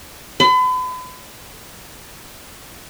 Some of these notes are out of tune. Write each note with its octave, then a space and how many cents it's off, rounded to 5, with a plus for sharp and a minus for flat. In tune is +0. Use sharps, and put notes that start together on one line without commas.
B5 +40